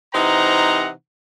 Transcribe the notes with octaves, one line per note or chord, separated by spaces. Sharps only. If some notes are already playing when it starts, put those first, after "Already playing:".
C3 E3 D#4 C5 F#5 A#5